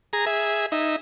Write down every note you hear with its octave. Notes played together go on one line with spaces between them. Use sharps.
G#4 A#5
G#4 E5
D#4 E5